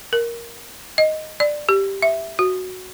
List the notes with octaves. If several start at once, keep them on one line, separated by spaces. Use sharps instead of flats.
A#4
D#5
D5
G4
E5
F#4